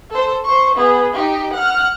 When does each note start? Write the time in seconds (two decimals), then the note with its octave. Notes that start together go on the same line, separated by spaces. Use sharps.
0.11 A4 C5
0.44 C5 C#6
0.76 B3 G#4
1.14 D#4 G4
1.53 F#5 F6